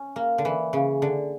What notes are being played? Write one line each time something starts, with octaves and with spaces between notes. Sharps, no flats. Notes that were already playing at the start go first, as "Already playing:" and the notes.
Already playing: C#4
A#3
D3
E3
C#3
D3